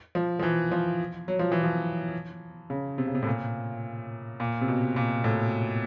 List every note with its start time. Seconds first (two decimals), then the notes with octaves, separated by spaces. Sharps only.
0.15 F3
0.39 F3
0.43 E3
0.72 F3
1.28 F#3
1.39 F3
1.52 E3
1.63 F3
2.70 C#3
2.98 C3
3.07 C#3
3.15 C3
3.22 A2
3.27 A#2
4.40 A#2
4.61 C3
4.68 B2
4.96 A#2
5.24 A2